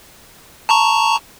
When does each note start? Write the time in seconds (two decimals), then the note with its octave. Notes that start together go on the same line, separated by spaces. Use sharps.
0.69 A5 A#5 C#6